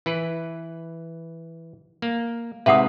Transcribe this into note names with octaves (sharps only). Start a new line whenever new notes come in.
E3 B4
A#3
G#2 C3 B4 E5 F#5 D#6